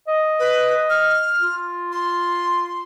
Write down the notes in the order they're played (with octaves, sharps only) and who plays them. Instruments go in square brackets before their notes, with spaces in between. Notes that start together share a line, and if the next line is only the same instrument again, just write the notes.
[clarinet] D#5
[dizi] B4
F6
[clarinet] F4
[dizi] C6